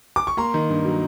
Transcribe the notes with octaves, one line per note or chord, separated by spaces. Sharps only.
D6
C#6
A#3 A#5 C6
D#3
G2
F#3